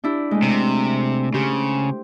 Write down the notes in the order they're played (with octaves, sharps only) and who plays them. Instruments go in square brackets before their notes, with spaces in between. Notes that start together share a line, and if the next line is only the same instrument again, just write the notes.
[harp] D4 E4 G4
G#3 A3
[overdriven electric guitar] C3
[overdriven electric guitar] C#3 [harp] G4 C5